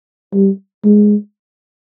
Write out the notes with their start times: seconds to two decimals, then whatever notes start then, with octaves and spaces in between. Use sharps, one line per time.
0.33 G3
0.85 G#3